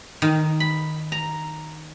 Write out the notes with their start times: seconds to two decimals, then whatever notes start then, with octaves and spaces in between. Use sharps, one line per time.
0.22 D#3
0.60 B5
1.12 A#5